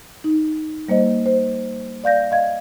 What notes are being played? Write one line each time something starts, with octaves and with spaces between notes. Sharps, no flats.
D#4
G3 A#3 C5 D#5
C5
D5 F5 G6 A#6
D#5 F5 G#6